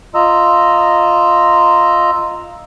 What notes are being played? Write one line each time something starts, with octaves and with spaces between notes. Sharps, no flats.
F4 D#5 A#5 E6